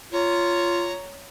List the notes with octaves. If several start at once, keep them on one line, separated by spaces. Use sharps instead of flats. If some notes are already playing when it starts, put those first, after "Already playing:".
F4 C#5 A#5